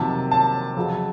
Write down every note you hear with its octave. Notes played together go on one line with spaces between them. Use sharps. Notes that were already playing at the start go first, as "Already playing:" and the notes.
Already playing: F2 C3 D#3 F#3 A#3 A5
A5
F2 C#3 F#3